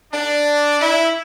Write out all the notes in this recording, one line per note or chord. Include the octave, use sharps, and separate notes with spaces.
D4
E4